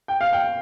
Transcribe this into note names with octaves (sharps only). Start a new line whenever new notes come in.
G5
F5
G5